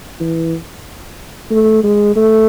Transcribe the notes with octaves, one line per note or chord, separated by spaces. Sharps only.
E3
A3
G#3
A3